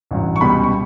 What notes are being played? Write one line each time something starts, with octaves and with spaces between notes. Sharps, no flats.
A1 G2 F#3
C#6
C#2 B2 G3 B5
C#6